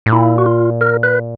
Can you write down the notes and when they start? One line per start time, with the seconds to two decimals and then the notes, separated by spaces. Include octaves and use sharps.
0.06 A2
0.12 A#2 E4
0.38 F#4
0.46 F4
0.81 A#4
1.03 B4